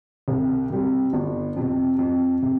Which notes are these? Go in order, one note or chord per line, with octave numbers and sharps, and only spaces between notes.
C2
C3 G3
G1
F2 C3
F2
C3